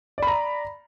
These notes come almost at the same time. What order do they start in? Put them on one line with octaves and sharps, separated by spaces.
D5 B5 A#5